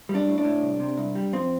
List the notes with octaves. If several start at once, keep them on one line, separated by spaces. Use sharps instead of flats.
G3
D4
A2
D4
A2
C2
C3
C2
G3
F2 C4